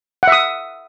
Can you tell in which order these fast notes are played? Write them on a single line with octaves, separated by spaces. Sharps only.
F#5 E5 D#6